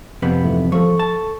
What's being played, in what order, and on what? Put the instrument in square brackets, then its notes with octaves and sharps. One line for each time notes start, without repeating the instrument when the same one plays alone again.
[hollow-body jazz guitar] F2 C3 B3
[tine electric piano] G#2 E3 A3
[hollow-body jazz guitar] F3 [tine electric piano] A4 C#6
[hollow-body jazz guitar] A5